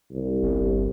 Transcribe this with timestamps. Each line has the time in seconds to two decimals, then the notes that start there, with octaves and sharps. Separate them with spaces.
0.12 C2
0.43 G1